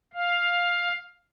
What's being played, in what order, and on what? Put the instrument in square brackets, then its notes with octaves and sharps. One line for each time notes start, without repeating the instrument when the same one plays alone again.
[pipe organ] F5